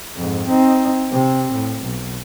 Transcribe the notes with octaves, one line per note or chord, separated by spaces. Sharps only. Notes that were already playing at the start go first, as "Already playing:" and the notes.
F2 G#2
C4 D#4
C3 C4
A2
B1